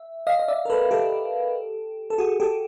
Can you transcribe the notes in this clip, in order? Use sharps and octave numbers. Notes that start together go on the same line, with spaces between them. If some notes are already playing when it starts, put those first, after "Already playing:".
Already playing: E5
D#5 F5
D#5
D5 E5
A#4
A4 B4
G4 A4
A4
F#4 G#4
G4 A4